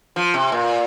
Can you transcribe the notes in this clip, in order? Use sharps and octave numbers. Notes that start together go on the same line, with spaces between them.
F3
C3
A#2